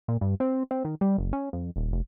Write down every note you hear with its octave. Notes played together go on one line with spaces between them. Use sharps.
A#2
G2
C4
C4
D#3
G3
F#1
C#4
F2
D#1
F1